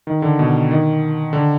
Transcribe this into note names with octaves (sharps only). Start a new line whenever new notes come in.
D#3
D3
B2
D#3
D3